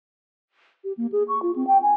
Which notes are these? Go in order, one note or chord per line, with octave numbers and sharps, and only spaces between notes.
G4
A#3
G#4
C#6
F4
C4
G5
G#5